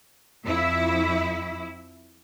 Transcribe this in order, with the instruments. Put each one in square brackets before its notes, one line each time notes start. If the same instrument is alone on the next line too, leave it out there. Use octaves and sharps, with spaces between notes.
[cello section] F2 E4 E5